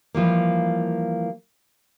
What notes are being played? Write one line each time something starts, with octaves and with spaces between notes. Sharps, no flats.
E3 F3 G3 A#3